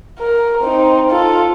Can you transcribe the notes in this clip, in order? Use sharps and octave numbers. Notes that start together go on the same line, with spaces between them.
A#4
C4 D#4
F4 A4